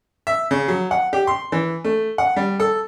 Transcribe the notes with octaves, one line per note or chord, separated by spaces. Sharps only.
E5
C#3
F#3
F#5
G4
C6
E3
A3
F#5
G3
A4